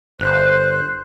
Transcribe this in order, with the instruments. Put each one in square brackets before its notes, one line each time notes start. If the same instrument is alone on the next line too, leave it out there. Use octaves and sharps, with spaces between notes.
[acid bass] G1 [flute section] C5 F#6